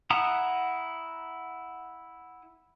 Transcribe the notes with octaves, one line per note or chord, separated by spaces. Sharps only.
E4 F#5 A#5 D#6